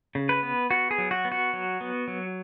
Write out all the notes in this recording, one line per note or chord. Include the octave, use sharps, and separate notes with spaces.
C#3
B4
B3
B3 F#4
G#4
F#3
F#4
B3
F#4
F#3
B3
F#3